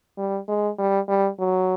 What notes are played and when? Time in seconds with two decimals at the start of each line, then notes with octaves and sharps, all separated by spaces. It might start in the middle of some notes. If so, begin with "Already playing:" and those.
0.18 G3
0.48 G#3
0.78 G3
1.08 G3
1.40 F#3